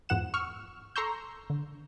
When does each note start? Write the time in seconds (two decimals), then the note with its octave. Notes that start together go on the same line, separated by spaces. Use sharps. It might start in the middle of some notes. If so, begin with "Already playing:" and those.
0.09 E2 G#2 F3 F#5 E7
0.34 C#6 E6 F6
0.96 A4 A#5 C6 C#6 E6 G6
1.50 D3